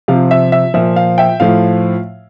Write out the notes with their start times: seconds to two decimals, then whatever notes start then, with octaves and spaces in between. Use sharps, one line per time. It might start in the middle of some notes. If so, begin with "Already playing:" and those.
0.08 C3 F3 F5
0.31 E5
0.52 E5
0.74 A#2 F3 E5
0.96 F5
1.18 E5 G5
1.40 A2 F3 F5